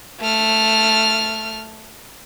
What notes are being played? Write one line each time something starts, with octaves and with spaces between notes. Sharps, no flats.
A3 F6